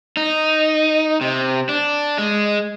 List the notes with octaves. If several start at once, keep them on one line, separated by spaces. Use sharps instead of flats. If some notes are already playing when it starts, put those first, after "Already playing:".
D#4
C3
D4
G#3